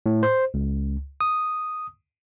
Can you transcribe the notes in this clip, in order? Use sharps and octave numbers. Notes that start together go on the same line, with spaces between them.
A2
C5
C#2
D#6